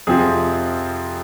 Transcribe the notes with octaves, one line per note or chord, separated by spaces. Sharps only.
F2 C3 F3 C4 G#4